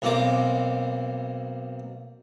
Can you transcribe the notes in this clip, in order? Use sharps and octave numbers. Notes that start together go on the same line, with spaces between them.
B1 B2 A#3 C4 D6